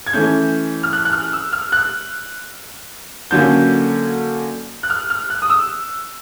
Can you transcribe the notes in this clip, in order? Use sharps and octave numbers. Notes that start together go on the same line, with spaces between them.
G#6
E3 A3 C#4 G6
F6
F#6
F#6
F6
E6
F6
F#6
D3 F#3 A#3 C#4 G6
F#6
F6
F6
F#6
D#6
E6